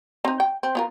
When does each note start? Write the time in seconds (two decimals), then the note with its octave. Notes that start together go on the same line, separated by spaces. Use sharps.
0.25 C4 D#4
0.40 G5
0.63 C4
0.75 B3 F4 A#4